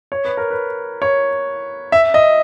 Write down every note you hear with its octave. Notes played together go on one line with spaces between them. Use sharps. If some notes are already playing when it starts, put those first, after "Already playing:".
C#5
B4
A#4
B4
C#5
E5
D#5